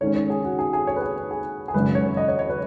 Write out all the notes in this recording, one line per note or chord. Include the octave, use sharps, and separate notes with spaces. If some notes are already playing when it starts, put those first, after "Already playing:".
G#2 D#3 G#3 C#4 C#5
C#5
G#4
F#4
G#4
G#4
C#5
B4
G#4
G#4
G#4
G#1 F#2 C#3 B4
C#5
D#5
C#5
C#5
B4